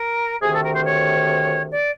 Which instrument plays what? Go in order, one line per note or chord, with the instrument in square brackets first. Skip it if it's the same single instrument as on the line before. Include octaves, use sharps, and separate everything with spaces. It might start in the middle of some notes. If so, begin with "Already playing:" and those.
Already playing: [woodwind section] A#4
D2 C3 D#3 G#4
A4
A#4
C5
C#5
D5